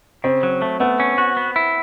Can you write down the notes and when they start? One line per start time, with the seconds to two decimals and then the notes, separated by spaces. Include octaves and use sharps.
0.24 C#3 C4
0.43 F#3
0.62 A3
0.80 A3 B3
1.00 C#4
1.18 F#4
1.37 B3
1.56 E4